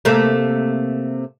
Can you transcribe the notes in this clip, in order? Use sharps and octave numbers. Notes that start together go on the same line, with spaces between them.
C3 A3 A#3